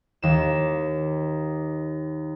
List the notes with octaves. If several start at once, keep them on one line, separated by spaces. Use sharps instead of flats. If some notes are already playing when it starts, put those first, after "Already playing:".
D#2 E7